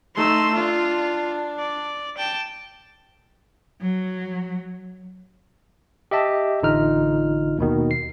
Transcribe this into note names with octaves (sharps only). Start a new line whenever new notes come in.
A3 D#4 C6 E6
D4 F4
D5
G5 A5
F#3
G4 D#5 E5 A5
A1 D3 D#4 F4 F6
D#2 B2 D#3
C7